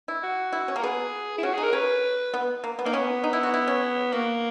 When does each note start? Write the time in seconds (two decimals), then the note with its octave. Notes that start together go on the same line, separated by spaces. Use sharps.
0.08 E4
0.23 F#4
0.53 E4
0.68 C#4
0.76 A#3 A#4
0.83 B3 G#4
1.38 E4
1.43 C#4 F#4
1.54 D#4 G#4
1.63 A#4
1.73 C#4 B4
2.34 B3
2.64 A#3
2.79 B3
2.85 A#3 D#4
2.93 B3 C#4
3.24 D#4
3.33 E4
3.43 F#4
3.54 E4
3.68 C#4
4.13 A#3 F#4